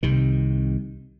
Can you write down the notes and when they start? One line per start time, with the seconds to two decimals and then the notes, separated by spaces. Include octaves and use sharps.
0.03 C2 C3 D#3